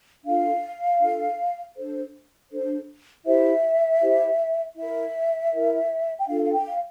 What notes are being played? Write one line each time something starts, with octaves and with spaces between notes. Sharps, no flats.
D4 F4 A4 F5
D4 F4 A4
D4 A4 C5
D4 A4 C5
E4 G4 C5 E5
E4 G4 C5
E4 A#4 E5
E4 A#4
G5
D4 F4 A4 F5
F5
G5
F5